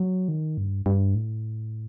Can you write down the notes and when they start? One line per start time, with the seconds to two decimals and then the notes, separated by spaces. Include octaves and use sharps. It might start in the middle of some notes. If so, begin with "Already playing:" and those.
Already playing: F#3
0.28 D#3
0.57 G2
0.86 G2
1.15 A2